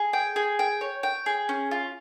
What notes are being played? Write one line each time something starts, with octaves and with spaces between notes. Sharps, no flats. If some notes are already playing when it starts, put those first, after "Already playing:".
Already playing: G#4
G5
G#4
G5
C#5
G5
G#4
C#4
F4